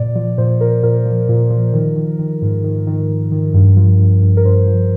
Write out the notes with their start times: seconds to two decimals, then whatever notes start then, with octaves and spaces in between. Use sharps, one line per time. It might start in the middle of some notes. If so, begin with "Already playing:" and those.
Already playing: A#2 D5
0.15 F3 D5
0.38 A#2 C5
0.61 A#2 A#4
0.83 A#2 A#4
1.05 F3
1.29 A#2
1.50 F3
1.73 D#3
1.96 D#3
2.19 D#3
2.42 G#2
2.64 D#3
2.87 D#3
3.09 D#3
3.32 D#3
3.54 G2
3.77 F3
3.99 G2
4.22 G2
4.37 A#4
4.45 G2 C5
4.67 F3